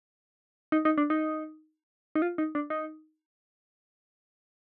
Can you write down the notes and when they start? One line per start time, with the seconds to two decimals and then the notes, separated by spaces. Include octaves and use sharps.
0.72 D#4
0.85 D#4
0.98 D4
1.10 D#4
2.15 D#4
2.22 F4
2.38 D#4
2.55 D4
2.70 D#4